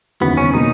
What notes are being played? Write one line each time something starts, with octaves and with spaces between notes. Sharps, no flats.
F#1 E2 D#3 F#3 B3 C#4
C#4
B2 A#3 D#4